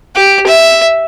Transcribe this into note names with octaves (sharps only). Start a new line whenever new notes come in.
G4
E5